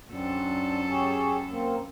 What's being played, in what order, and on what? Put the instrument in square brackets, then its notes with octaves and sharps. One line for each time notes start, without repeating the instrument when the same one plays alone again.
[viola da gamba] F#2 A4 [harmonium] C4 D4
[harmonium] G4 G#4 C#5
A#3 C4